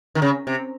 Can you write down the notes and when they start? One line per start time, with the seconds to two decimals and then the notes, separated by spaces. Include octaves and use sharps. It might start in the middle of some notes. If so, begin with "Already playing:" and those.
0.15 D#3
0.22 C#3
0.47 C3